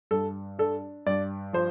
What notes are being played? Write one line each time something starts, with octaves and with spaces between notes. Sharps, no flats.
G2 A4
D4 A4
G2 D5
F3 C5